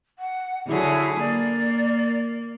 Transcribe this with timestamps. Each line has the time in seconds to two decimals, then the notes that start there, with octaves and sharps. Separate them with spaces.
0.19 F#5
0.68 D3 F#3 E4 G#4
1.19 A#3 D5